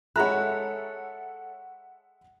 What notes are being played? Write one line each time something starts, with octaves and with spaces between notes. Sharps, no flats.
G#3 A4 C#5 E5 F#5 A#5 B5 F#6